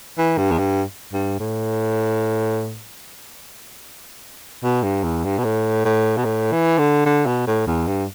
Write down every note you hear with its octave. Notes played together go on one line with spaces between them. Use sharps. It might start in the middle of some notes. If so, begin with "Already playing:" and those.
E3
G2
E2
G2
G2
A2
B2
G2
E2
G2
B2
A2
A2
B2
A2
E3
D3
D3
B2
A2
E2
G2